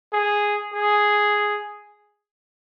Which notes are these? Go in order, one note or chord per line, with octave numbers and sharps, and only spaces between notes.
G#4
G#4